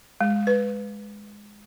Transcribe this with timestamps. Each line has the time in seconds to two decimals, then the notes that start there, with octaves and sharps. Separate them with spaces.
0.21 G#3
0.47 B4